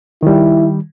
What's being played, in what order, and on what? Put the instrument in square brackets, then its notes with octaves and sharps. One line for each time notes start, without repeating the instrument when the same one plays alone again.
[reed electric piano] D#3 G3 [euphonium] E4